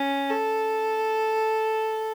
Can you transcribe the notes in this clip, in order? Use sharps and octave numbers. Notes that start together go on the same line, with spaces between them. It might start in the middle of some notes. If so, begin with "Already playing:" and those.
Already playing: C#4
A4